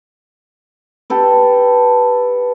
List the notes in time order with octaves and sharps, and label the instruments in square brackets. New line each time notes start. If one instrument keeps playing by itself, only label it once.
[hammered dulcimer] G4 A4 B4